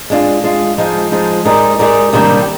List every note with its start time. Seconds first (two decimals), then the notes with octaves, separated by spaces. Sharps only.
0.10 G#3 D4 F4
0.44 G#3 D4 F4
0.78 F3 G#3 D#4
1.12 F3 G#3 D#4
1.45 G#3 D#4 G4 A#4 D5
1.79 G#3 D#4 G4 A#4 D5
2.13 C3 D#3 G3 A#3 D4